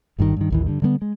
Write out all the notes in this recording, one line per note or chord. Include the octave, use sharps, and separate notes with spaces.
G1 G2 C3 D#3
G2 D#3
A1 D#2 E3
G2 D3
D3 G3 G#3 B3
G#3